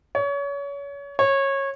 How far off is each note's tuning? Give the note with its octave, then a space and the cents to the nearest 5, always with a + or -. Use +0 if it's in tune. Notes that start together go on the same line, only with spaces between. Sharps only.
C#5 +30
C#5 -20